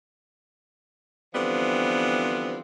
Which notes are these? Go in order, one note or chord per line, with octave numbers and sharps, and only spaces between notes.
D3 E3 F3 G3 B3 C4